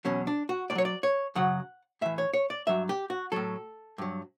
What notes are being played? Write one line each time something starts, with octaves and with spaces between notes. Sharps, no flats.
E2 B2 F#3 C#4
D4
F#4
A2 D5
F#3 C#5
D5
C#5
F#2 C#3 F#3 F#5
A2 E3 E5
C#5
C#5
D5
G2 F#3 E5
G4
F#4
A2 F#3 A4
G2 F#3